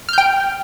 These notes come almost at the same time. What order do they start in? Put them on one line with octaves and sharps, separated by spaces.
F6 G6 G5